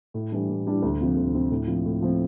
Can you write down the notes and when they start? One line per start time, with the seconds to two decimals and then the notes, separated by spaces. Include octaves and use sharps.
0.14 A2
0.32 E3 G3 D4
0.49 A2
0.66 E3 G3 D4
0.82 D2
1.00 C3 F3 C4
1.16 D2
1.34 C3 F3 C4
1.51 A2
1.67 F3 C4
1.85 A2
2.02 F3 C4